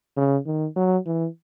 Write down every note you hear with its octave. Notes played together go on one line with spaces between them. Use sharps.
C#3
D#3
F#3
E3